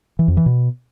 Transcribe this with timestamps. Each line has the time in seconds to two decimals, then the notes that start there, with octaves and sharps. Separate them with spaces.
0.19 E3
0.28 F2
0.37 E3
0.46 B2